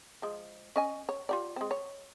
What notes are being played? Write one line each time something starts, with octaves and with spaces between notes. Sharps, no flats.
F3 G#3
C#4 D#5 G#5
C#5
F4 G4 D5
G#3 C4
C#5